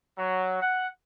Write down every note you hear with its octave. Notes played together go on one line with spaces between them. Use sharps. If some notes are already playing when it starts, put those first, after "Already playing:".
F#3
F#5